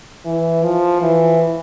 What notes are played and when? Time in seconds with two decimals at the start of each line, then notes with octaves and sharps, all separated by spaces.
0.25 E3
0.64 F3
1.02 E3